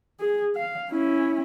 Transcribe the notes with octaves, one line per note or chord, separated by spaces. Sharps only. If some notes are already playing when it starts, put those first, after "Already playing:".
G#4
F5
C#4 E4